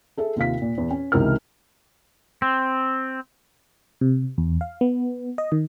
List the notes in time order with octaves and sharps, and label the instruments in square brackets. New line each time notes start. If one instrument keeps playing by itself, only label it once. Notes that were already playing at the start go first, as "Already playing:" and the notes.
[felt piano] G#4 A4 E5
D#2 C3 F4 F5 B6
A#2
E2
C#4
C#2 C3 E3 D#4 A#4 F6
[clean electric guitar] C4
[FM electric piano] C3
E2
F5
B3
D#5
D#3